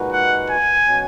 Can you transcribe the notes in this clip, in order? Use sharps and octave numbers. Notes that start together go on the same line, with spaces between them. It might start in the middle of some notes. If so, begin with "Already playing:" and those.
Already playing: A#2 G#3 D#4 F#4 B4
F#5
G#5
B2 F#3 C#4